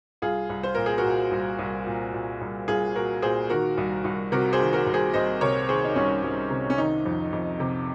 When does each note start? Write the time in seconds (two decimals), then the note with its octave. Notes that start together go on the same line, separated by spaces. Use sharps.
0.22 C2 F4 G#4
0.49 C2
0.63 C5
0.75 A#2 A#4
0.86 G#4
0.98 F#4 A#4
1.04 A#2
1.31 C2
1.59 C2
1.86 A#2
2.13 A#2
2.41 C2
2.68 C2 F4 G#4
2.95 A#2 F#4 A#4
3.22 A#2 G#4 C5
3.50 D#3 F#4 A#4
3.77 C2
4.04 C2
4.32 C3 F#4 A#4
4.53 G#4 C5
4.60 D#3
4.73 F#4 A#4
4.86 C2
4.93 G#4 C5
5.14 C2 C5 D#5
5.41 C3 A#4 C#5
5.68 D#3 G#4 C5
5.84 D#4
5.96 C2 C#4
6.23 C2
6.50 C3
6.70 C#4
6.78 D#3 D#4
7.06 F2
7.33 F2
7.60 C3